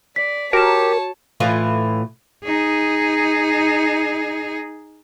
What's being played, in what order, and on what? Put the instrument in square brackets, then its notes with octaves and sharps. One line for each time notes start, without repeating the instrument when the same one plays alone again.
[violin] D5 [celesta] B6
[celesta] F#4 E7 [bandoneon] G4 [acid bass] A#4 [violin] C#5 A5
[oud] A2 E3 F4
[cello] D#4 G#4